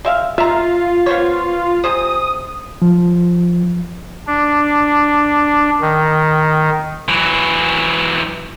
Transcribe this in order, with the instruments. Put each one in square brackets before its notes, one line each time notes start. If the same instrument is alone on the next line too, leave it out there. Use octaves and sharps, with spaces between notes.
[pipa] G#3 E5 F5
[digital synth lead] F4 [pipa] E5 A#5
[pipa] B3 C5 C#5
[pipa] C3 G#4 C5 [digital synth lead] D#6
[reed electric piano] F3
[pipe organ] D4
D#3
[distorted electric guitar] E3 F#3